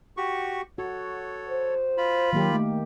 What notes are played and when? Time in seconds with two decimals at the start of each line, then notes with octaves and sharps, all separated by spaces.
0.17 F#4 G4 C#6
0.78 F#4 A4 C#5
1.47 C5
1.97 F4 B5
2.33 D#3 F#3 A#3 G4
2.53 A3